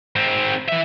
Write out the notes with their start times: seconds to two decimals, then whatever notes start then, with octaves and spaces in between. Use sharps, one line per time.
0.16 G#2 C4
0.69 E3 E5